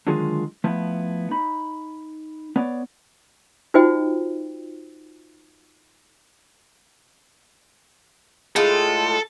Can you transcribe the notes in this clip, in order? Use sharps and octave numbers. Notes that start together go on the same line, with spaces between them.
D3 D#3 F#3 G#3 F4 G#4
F3 A3 B3 E4
D#4 B5
B3 C#5 D5
D#4 F4 F#4 C5 D#5 G5
A2 G#3 F4 A4